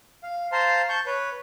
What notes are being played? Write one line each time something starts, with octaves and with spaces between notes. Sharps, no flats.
F5
C5 F5 A5 A#5 C6
A5 C#6 G6
B4 C#5